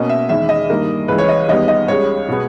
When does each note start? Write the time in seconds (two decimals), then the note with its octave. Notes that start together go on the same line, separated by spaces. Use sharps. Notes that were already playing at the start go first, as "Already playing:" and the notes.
Already playing: B2 A#3 C#4 D#5
0.09 E5
0.29 E2 D#3 G#3 E5
0.49 D#5
0.69 G2 D#3 A#3
1.08 C#2 C#3 E3 B4
1.18 C#5
1.28 D#5
1.48 D#2 D#3 G3 B3 D#5
1.68 D#5
1.88 C#2 C#3 G3 C#5
2.28 B2 G#3 B3